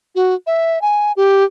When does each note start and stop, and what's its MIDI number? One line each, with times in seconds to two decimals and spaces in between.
0.15 0.34 66
0.47 0.81 76
0.82 1.12 80
1.16 1.44 67